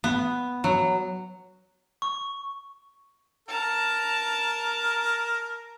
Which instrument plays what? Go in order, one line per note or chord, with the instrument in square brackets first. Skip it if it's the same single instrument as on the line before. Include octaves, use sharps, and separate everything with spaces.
[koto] B3
F#3
[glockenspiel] C#6
[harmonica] A#4 [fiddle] A5 A#5